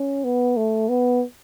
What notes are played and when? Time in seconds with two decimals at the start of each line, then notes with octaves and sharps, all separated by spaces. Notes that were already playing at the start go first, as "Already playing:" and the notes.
Already playing: C#4
0.24 B3
0.57 A3
0.89 B3